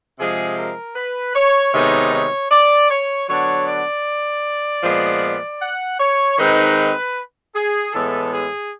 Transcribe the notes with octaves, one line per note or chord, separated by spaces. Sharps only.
C3 F3 G#3 G#4
A#4
B4
C#5
C3 D#3 G#3 B3 D#4 C#5
C#5
D5
C#5
D3 F#3 B3 D4 C#5
D5
A#2 F3 G#3 B3
F#5
C#5
D#3 G#3 C4 D#4 B4
G#4
A2 E3 G#3 B3 A4
G#4